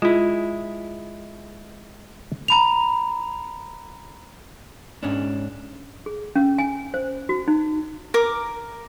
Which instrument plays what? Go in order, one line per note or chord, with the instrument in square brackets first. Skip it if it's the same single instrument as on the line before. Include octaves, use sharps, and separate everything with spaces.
[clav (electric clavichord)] G#3 E4 [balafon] F4
[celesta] A#5 B5 F7
[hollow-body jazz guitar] G#2 C#4 D4
[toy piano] G#4
C#4
G#5
C5
F#4
D#4
[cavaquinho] A#4 D6